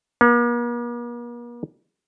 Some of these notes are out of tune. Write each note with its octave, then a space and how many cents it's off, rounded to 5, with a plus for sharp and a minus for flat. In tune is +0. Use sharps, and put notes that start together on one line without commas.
A#3 +45